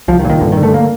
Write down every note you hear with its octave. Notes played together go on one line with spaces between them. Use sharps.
C2 F3
D#3
A#2
D#3
G2 D3
D3 D#3
A3
A#3